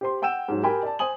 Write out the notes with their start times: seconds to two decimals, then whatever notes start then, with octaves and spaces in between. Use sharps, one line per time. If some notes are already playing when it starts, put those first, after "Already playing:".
0.01 G4 C5 C6
0.22 F#5 G5 E6 G6 E7
0.48 G#2 F#3
0.63 G4 A#4 G5 G#5 B5
0.83 D5 A5
0.99 C5 G#5 D#6 F#7